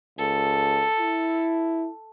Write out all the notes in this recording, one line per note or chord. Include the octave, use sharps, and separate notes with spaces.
C#2 A4
E4